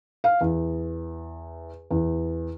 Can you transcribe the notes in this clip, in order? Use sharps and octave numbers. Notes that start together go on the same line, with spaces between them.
F5
E2
E2